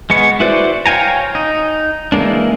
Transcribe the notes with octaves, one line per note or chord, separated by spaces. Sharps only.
G#3 B3 C#6
E4 F#4 B4 C5 D5
C#5 F5 G5 G#5 A#5
D#4
E3 G#3 A#3 D4